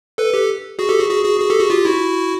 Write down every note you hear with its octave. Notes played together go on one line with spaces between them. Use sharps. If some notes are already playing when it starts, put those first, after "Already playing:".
A4 B4
G4 A4
F#4 G#4
G4 A4
F#4 G#4
F#4 G#4
F#4 G#4
F#4 G#4
G4 A4
F#4 G#4
F4 G4
E4 F#4